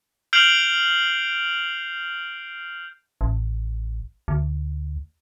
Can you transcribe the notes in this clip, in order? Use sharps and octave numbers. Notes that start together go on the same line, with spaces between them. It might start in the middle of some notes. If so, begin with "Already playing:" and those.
F6 G6 C7 D7 F7 F#7
A1
D2